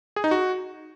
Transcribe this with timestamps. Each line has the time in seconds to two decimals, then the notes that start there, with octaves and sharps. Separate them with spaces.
0.16 G#4
0.24 D#4
0.31 F#4